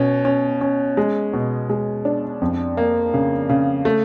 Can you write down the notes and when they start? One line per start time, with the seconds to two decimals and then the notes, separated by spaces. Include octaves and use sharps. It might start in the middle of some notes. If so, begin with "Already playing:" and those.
Already playing: B2 C#4
0.25 C#4
0.61 C#4
0.97 G#3
1.33 B2
1.69 G#3
2.05 D4
2.41 F2
2.77 A#3
3.14 C#3
3.49 C#3
3.85 A3